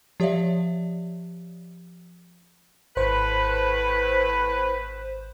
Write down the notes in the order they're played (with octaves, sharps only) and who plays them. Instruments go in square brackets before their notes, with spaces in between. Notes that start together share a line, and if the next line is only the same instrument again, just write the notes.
[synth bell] F3 G4 C#5 D5 E5 F5
[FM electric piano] G#1 C5 [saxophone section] A2 B4